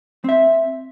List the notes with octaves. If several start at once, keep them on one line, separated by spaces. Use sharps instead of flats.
C4 E5